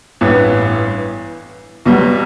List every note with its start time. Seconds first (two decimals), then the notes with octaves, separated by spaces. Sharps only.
0.21 A1 G2 E3 B3
1.86 B1 B2 G3